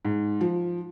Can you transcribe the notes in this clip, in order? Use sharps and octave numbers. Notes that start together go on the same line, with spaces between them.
G#2
F3